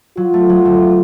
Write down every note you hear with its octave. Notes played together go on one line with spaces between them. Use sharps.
F#3 F4
A3
F#3
D2